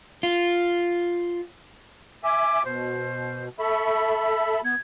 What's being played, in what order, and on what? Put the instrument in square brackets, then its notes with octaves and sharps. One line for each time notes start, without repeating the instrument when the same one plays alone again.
[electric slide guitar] F4
[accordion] E5 G#5 [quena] D6
[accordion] B2 [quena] C5
[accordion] A4 E5 B5 [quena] C#6
[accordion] B3 [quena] G#6